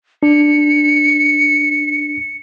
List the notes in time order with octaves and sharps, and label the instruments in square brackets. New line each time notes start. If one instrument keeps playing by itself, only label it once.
[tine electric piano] D4 [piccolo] C#7